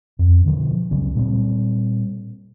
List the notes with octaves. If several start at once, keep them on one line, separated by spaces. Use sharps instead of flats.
F2
B2 D3 D#3 F3
C#2 C#3 F#3 C#4
A#2 G3 G#3 C4